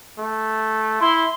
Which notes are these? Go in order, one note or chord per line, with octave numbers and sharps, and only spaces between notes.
A3
E4 C6